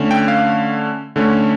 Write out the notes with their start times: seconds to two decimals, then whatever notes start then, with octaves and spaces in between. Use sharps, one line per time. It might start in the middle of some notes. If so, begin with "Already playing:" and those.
Already playing: D3 A3 C#4
0.11 G5
0.28 F5
1.16 D3 A3 C#4